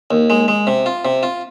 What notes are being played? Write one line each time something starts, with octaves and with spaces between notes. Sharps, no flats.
D#2
G#3
G#3
C3
F4
C3
F4